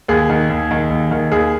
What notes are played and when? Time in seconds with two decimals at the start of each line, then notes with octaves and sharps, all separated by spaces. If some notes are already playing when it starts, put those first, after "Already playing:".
0.08 D#2 G#4
0.30 D#3
0.49 D#2
0.71 D#3
0.90 D#2
1.11 D#3
1.32 D#2 G#4